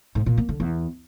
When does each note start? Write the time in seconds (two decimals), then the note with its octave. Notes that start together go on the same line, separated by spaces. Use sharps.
0.15 G#2
0.26 A#2
0.38 A#3
0.49 D3
0.60 E2